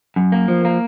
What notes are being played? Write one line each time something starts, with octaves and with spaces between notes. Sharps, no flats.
F#2
A#3
F3
A#3